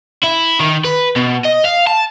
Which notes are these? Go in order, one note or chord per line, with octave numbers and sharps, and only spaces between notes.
E4
D#3
B4
B2
D#5
F5
A5